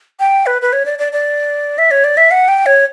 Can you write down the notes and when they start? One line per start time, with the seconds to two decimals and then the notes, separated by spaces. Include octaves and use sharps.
0.20 G5
0.46 B4
0.62 B4
0.73 C#5
0.86 D5
0.99 D5
1.13 D5
1.78 E5
1.91 C#5
2.04 D5
2.17 E5
2.31 F#5
2.48 G5
2.66 C#5